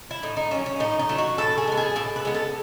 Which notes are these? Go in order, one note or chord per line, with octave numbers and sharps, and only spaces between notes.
E4
A2 D#4
D#4
F#3 A3 C#4
C#4
A2 D#4
D#4
F#3 A3
F#4
A2 A4
G#4
G#3 B3
G#4
A2 A4
B4
G#3 B3
A4